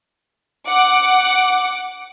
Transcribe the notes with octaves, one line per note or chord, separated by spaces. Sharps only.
F#5 D6